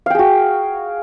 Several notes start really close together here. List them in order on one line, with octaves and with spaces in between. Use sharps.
F5 G5 G#4 F#4